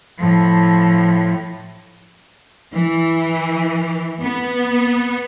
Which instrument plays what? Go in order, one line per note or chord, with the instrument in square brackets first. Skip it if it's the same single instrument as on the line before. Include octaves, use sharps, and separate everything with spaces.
[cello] A2 F3
[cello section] E3
B3